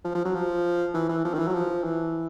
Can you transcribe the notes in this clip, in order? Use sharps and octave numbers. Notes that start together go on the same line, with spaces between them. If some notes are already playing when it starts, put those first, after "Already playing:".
F3
F3
F#3
F3
E3
E3
F3
D#3
E3
F#3
F3
E3